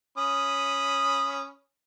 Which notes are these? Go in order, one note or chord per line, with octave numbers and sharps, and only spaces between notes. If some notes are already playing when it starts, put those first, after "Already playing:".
C#4 B5 D#6